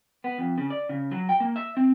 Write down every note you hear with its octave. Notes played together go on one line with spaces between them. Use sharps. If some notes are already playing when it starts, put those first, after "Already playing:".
B3
F2
C#3
D5
C#3
F#3
G5
A#3
E5
C4